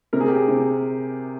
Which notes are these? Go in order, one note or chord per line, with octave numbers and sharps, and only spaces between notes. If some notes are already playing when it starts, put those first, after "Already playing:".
C3 A#4
G#4
G4
G#4
C3